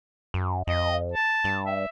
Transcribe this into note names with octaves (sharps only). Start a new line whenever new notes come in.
F#2
F2 D#5
A5
G2
E5